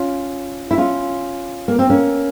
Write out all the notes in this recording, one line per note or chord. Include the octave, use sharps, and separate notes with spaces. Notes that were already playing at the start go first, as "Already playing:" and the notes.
Already playing: C#4 F4
E4
C#4 F4
A#3
C4
A#3 C#4